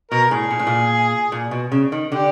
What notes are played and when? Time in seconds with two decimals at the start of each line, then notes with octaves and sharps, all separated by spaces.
0.11 B2 A#4
0.31 A2 G#4
0.51 A#2
0.59 A2
0.67 A#2
1.32 A#2
1.51 B2
1.72 C#3
1.92 D#3
2.12 D3 G4